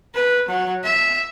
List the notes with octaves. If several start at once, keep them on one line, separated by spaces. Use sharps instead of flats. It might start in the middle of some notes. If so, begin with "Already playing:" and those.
B4
F#3
E5